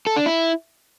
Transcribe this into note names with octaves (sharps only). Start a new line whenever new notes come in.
A4
D4
E4